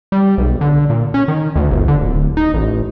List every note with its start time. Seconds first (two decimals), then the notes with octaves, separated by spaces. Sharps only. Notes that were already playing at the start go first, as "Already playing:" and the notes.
0.12 G3
0.38 B1
0.61 D3
0.90 A#2
1.14 C#4
1.28 D#3
1.56 D2
1.71 G1
1.88 D3
2.01 D1
2.37 D#4
2.54 A1